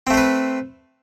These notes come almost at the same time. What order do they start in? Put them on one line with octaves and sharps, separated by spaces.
C4 A3 C5 B4